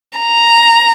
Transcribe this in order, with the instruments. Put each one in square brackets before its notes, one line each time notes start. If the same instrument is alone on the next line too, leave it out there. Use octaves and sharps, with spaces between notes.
[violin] A#5